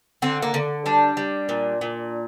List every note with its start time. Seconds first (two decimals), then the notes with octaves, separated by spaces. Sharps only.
0.22 D3 C4
0.42 A#3
0.54 D3
0.86 G3 D4
1.17 G3
1.49 A#2
1.81 A#2